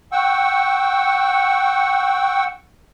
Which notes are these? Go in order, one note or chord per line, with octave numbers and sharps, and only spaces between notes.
F#5 G5 C#6 E6